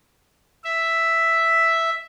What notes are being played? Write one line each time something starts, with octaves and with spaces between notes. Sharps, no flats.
E5